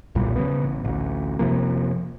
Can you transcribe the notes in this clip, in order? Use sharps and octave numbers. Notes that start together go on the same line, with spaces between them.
B1 E2 A#2 G3
C#3 B3
A1
A1 D2
F1 C3 F3 A#3